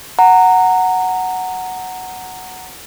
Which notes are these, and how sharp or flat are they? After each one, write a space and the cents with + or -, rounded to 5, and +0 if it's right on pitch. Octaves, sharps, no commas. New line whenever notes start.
F#5 +0 A#5 -15